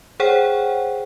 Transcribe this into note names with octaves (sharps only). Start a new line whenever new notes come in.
G#4 C5 C#5 F#5 G5